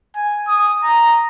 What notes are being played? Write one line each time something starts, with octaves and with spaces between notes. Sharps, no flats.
G#5
D#6
A#5